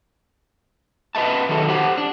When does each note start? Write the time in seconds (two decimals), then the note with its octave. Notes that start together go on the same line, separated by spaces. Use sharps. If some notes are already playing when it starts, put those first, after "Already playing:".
1.15 B4 D#5 E5 A5
1.49 D#3 F#3 A4
1.69 G4 C5 F#5
1.97 D4